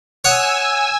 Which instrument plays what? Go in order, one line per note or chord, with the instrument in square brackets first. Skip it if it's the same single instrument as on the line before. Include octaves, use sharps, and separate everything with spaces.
[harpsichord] C#5 F#5 D#6 [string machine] G#5 E6